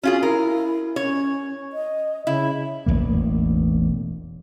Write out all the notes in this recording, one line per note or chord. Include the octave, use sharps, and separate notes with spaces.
C#4 F4 F#4 G#4
E4 A#4
C#4 C#5
D#5
C#3 E4
E1 A1 A2 A#3